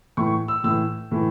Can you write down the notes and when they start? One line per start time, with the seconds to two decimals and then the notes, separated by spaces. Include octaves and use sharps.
0.17 A2 E3 C#6
0.48 E6
0.64 A2 E3 E6
1.11 A2 E3